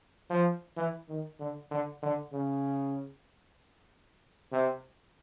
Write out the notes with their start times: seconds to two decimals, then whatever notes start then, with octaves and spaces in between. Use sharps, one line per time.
0.30 F3
0.77 E3
1.09 D#3
1.40 D3
1.71 D3
2.03 D3
2.33 C#3
4.52 C3